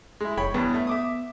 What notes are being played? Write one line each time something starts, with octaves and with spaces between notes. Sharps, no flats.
G#3 E4
F1 C#5 G5 B5
E2 G2 B3
A3
E5 D6 D#6